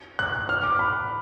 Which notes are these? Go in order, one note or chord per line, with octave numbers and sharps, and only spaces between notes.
F#6
F6
D6
B5